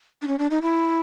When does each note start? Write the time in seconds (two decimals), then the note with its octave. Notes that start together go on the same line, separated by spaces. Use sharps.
0.22 D4
0.27 C#4
0.39 D4
0.51 D#4
0.62 E4